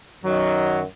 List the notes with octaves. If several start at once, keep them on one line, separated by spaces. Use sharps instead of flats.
F#2 D#3 F#3